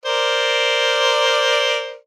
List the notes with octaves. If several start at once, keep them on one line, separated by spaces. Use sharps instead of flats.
A#4 C5 D5